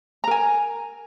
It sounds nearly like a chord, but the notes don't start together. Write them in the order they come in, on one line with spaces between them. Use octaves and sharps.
A#5 A#4 G#5